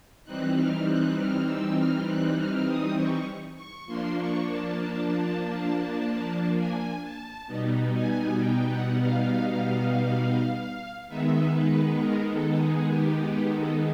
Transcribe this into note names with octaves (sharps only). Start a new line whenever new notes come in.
E3 G3 C4 D#4 F#6
F6
F#6
F6
E6
F6
F#6
F6
D#6
C#6
C#6
F3 A#3 D4 C6
C#6
A5
A5
G#5
A5
B2 G3 B3 D#4
G#5
G5
F#5
F5
D#3 G#3 B3 D#4 E5
B4
A#4
A4
G#4
G4
G4
A4